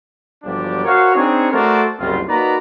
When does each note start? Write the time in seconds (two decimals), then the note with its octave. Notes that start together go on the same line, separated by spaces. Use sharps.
0.43 G1 F3 F#3 D4 G4 D5
0.84 F#4 A#4 C5 C#5 F5
1.15 C4 D4 D#4 G#4 C#5
1.52 A3 F#4 A4 A#4 C5 D5
1.99 F#1 C2 G3 C4 F4
2.28 A#3 D#4 F#4 B4 D5 A#5